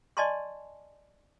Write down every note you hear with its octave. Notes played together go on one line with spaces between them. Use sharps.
D5 D#5 G#5 A5 C6 C#6